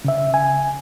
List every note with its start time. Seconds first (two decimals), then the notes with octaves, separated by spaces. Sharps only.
0.05 C#3 E5
0.34 G#5